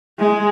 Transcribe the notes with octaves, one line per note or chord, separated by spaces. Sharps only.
G#3